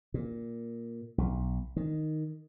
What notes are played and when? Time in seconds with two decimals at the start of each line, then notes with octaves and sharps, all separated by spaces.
0.14 A#2
1.18 B1
1.76 D#3